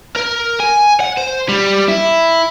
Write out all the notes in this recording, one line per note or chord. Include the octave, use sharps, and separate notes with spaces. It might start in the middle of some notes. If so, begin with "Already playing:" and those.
A#4
G#5
F#5
C5
G3
E4